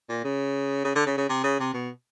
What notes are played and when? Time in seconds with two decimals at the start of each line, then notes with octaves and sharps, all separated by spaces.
0.09 A#2
0.24 C#3
0.84 C#3
0.95 D3
1.06 C#3
1.17 C#3
1.29 C3
1.44 C#3
1.59 C3
1.74 B2